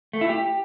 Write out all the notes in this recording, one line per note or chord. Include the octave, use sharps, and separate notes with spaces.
A3
E4
G4